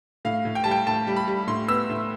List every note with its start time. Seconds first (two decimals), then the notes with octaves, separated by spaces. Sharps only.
0.25 A2 F5
0.45 A2
0.55 G5
0.64 G3 A5
0.71 G5
0.87 A2 A5
1.07 G3
1.16 B5
1.28 G3
1.47 A2 C6
1.68 B3 E6
1.89 A2